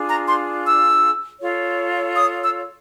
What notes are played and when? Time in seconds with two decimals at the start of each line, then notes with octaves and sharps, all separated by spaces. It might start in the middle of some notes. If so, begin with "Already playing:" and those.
Already playing: D4 F4 G#4
0.08 A#5
0.27 C6
0.65 E6
1.40 F4 A4 C#5
2.17 D#6
2.42 E6